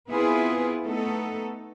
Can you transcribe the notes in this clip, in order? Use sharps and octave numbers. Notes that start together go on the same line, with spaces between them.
B3 C4 E4 F4 G#4 B4
A3 B3 D#4 A4